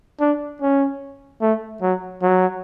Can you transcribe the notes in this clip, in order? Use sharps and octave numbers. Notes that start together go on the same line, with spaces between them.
D4
C#4
A3
F#3
F#3